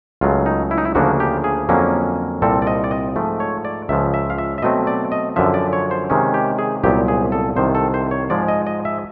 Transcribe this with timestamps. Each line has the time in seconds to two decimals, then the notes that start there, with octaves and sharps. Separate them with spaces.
0.21 C#2 C#3 F#3 A3 F4
0.46 D#4
0.71 E4
0.78 D#4
0.85 E4
0.95 D2 C#3 F3 A#3 D4 F#4
1.20 G4
1.44 G#4
1.69 F2 D3 F#3 A#3 C#4
2.42 C2 A#2 G3 C4 A4
2.62 D5
2.67 D#5
2.84 D5
2.91 D#5
3.16 G#2 F3 A3
3.40 C#5
3.65 D5
3.89 C#2 C#3 F3 E5
4.14 E5
4.30 F5
4.38 E5
4.58 E5
4.62 B2 F#3 A3 C4 D#5
4.87 D5
5.12 D#5
5.36 F#2 D3 F3 E5
5.54 D5
5.73 C#5
5.91 C5
6.10 C3 D#3 G#3 C#4
6.34 G4
6.59 G#4
6.84 C2 A#2 F#3 B3 G4
7.08 G#4
7.32 A4
7.56 C2 C3 D#3 C5
7.75 A4
7.94 C5
8.11 C#5
8.30 G#2 F3 G#3 D5
8.48 D#5
8.67 D#5
8.85 E5